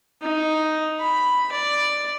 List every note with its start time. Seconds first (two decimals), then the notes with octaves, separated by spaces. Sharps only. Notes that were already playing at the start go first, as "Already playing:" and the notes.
0.22 D#4
1.00 B5
1.52 D5